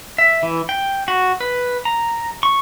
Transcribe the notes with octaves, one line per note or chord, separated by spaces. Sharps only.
E5
E3
G5
F#4
B4
A#5
C#6